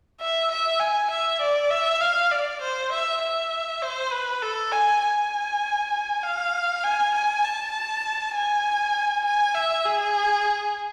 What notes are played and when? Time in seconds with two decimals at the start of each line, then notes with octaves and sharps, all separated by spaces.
0.20 E5
0.51 E5
0.80 G#5
1.10 E5
1.41 D5
1.71 E5
2.01 F5
2.31 D5
2.61 C5
2.92 E5
3.22 E5
3.82 C5
4.12 B4
4.42 A4
4.72 G#5
5.02 G#5
6.23 F5
6.84 G#5
7.14 G#5
7.44 A5
8.35 G#5
9.25 G#5
9.55 E5
9.85 G#4